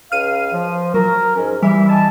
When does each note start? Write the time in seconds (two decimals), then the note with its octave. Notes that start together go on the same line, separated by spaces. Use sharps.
0.12 C#2 F5 F6 D#7
0.53 F3
0.94 F#3 A#4
1.36 G#2 C#4
1.63 E3 G3 E5
1.89 D#5 G#5 A5